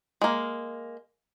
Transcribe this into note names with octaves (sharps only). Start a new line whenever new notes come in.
G#3 A#3